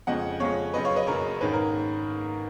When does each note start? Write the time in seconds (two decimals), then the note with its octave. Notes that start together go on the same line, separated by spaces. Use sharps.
0.07 F2 C#3 G#3 C#4 D#5 F#5
0.40 F2 C#3 G#3 C#4 C#5 F5
0.73 F#1 F#2 C#3 B4 D#5
0.85 C#5 F5
0.96 B4 D#5
1.07 F#1 F#2 C#3 A#4 C#5
1.41 G#2 D#3 A#3 C#4 B4
1.53 A#4